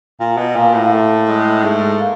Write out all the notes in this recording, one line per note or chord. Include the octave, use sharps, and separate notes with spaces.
A#2
B2
A#2 A#3
A2
A#3
A3
G#3
G#2 A3
A#3